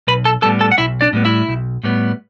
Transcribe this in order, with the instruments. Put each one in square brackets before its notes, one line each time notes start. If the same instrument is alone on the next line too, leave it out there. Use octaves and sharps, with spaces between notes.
[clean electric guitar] B1 B4 B5
A4 A5
A2 G3 B3 A4 A5
A4 A5
F#5
B1 E4 E5
D4 D5
A2 G3 B3
E4 E5
B1
A2 G3 B3